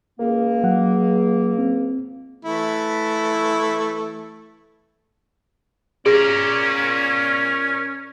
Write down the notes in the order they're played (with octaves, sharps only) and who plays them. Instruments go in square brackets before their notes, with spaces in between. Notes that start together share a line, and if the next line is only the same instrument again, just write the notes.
[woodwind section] C#2 A#3 [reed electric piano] A#4
[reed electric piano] F#3 F#5
C4
[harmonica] E3 A3 E4
[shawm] C#4 [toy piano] G#4 [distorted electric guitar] A#4 D5